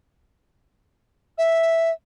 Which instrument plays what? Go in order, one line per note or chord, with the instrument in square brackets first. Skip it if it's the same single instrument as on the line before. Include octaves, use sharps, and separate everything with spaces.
[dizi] E5